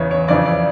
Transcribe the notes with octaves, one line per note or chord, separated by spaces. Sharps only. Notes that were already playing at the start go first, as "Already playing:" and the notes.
Already playing: E2 C#3 E3 C#5
C#5
F2 C#3 E3 D5
D5